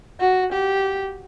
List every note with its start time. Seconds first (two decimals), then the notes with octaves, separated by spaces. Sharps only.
0.20 F#4
0.53 G4